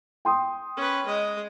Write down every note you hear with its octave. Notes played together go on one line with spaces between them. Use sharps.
G5 C6 D#6
C#4 B4
G#3 D#5